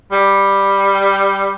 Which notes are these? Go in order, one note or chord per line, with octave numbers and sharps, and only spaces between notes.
G3